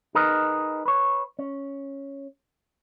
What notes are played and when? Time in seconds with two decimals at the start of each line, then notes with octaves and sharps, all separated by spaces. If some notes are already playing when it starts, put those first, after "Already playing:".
0.15 D#4 G#4 A#4 B4 D#5
0.86 B4 C#5
1.39 C#4